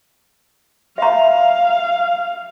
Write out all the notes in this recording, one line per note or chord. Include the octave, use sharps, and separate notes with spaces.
E5 F5 A#5